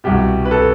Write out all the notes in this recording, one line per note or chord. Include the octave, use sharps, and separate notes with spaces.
C2 B2 G4
B4
A4